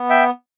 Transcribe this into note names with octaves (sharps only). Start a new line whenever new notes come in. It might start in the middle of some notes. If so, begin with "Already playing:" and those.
Already playing: B3
E5 G5